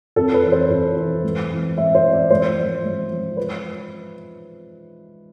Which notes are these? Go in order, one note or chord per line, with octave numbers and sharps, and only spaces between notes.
F2 A4
B4
E3
C5
F2
E3
G#2
E3
G#2 E5
C5
E3
D5
G#2 C5
F3
G#2
F3
B4